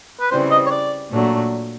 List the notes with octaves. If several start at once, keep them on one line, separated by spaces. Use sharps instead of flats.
B4
C#3 E3 G3 C4 C5
D#5
C#5
D5
A#2 F#3 A3 D4